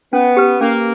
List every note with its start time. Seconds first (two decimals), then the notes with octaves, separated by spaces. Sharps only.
0.13 B3 C#4
0.37 G4 B4
0.61 A#3 C#4